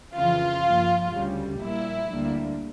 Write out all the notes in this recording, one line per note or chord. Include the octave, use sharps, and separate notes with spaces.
F2 C#3 E3 F4
G2 F3 A#3
D2 C#3 G3
A#1 A#2 G3 A#3 E4
D2 D3 G3 A#3